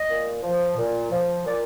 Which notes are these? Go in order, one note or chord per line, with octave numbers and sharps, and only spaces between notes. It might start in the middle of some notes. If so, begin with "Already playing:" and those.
Already playing: D#5
A#2
F3
A#2
F3
A#2 D5